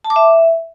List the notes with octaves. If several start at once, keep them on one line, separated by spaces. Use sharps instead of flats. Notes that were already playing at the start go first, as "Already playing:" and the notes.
A5
D6
E5